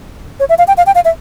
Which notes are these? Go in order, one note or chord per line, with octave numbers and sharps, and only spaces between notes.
C#5
E5
F5
G5
F5
G5
F5
E5